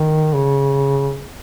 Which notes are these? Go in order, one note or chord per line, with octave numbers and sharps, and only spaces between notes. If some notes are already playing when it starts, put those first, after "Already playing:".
Already playing: D#3
C#3